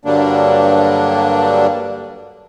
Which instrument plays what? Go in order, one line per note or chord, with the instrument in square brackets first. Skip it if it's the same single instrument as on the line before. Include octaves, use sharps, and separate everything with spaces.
[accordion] G2 D3 F#3 G3 A#3 D4